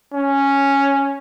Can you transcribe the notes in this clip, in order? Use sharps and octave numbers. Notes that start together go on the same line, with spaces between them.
C#4